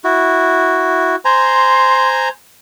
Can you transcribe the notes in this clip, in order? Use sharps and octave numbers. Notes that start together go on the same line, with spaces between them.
E4 F#4
C5 G#5 A#5 C6